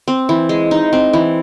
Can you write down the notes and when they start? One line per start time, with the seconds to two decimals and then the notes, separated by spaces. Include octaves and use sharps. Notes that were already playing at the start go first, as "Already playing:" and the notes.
0.08 C4
0.29 E3
0.49 G#3
0.71 D#4
0.93 C4
1.13 E3